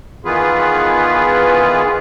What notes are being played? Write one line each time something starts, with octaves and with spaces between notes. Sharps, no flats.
D#3 E3 B3 F4 G#4 B4